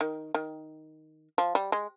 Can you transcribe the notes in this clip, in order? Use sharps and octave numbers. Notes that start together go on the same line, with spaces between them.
D#3
D#3
F3
G3
G#3